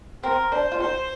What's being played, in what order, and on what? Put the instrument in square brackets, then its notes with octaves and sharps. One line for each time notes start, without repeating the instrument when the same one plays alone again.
[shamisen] C4 [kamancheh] A#4
[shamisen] D4 [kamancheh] C5
[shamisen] F4
[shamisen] D#4 [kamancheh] C5